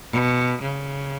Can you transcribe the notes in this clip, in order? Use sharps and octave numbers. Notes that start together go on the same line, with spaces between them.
B2
C#3